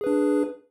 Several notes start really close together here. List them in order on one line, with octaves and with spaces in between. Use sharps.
G#4 B4 D4